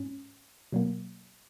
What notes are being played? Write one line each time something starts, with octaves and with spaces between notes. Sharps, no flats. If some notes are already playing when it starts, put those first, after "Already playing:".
Already playing: G#2 C#4
B2 F#3 A#3